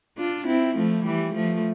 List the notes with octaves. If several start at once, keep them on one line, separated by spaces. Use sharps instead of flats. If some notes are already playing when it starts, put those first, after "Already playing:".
D4 F4
C4 E4
F3 A3
E3 G3
F3 A3